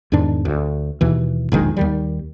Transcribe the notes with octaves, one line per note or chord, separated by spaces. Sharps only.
E2 G#2 D#3 D4
D2
D#2 B2 E3
E1 A#1 D#3 G#3
D#2 D#3 G3